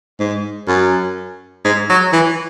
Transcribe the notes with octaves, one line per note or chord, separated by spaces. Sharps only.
G#2
F#2
G#2
F#3
E3